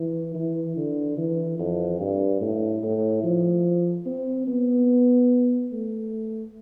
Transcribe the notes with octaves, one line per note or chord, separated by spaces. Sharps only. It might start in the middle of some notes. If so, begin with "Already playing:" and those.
Already playing: E3
E3
D3
E3
F2
G2
A2
A2
F3
C4
B3
A3